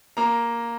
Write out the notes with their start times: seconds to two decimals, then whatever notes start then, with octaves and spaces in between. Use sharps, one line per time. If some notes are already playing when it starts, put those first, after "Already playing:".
0.17 A#3 A#5